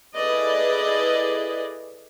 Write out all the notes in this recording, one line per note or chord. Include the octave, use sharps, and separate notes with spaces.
E4 G#4 A4 B4 D5 D#5